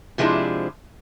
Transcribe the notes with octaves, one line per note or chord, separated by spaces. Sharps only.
C3 F3 G#3 C4 D4 E4